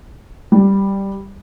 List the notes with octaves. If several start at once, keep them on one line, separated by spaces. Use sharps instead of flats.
G3